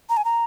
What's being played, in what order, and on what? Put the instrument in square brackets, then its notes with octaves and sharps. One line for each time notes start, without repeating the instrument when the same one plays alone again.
[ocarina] A#5
G#5
A#5